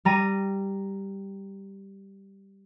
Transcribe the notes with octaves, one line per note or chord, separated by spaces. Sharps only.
G3 A#5 D#7